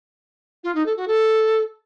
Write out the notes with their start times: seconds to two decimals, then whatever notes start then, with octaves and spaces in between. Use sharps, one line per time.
0.64 F4
0.75 D#4
0.86 A4
0.97 F#4
1.08 A4